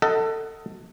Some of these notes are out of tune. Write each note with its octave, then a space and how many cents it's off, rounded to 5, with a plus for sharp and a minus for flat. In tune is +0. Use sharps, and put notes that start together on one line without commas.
A4 +25 D#5 +30 F#5 +10